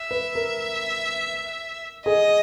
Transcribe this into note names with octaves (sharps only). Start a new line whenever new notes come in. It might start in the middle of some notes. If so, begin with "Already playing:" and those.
Already playing: E5
B4
A#4
G#4 D#5